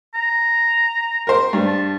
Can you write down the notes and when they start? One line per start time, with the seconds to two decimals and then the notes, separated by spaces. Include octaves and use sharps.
0.14 A#5
1.27 A#4 C5
1.53 G2
1.67 A5